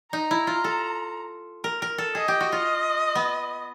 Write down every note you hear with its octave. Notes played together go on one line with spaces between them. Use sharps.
D#4 A#5
E4
F4
A4
A#4
A#4
A4
G#4 D#5
G4
F#4
F4
B3